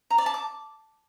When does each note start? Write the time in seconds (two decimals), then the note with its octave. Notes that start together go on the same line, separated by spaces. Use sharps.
0.10 A#5
0.18 D5
0.26 A5
0.34 D6